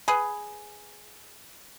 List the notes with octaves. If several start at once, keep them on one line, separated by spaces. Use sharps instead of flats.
G#4 B4